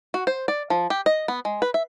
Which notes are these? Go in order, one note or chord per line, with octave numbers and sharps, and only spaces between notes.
F#4
C5
D5
F3
G4
D#5
B3
G#3
B4
E5